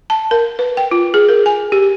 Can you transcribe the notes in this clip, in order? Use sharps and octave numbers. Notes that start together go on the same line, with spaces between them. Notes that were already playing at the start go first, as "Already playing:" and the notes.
A5
A#4
B4
G5
F4
G#4
A#4
G#5
G4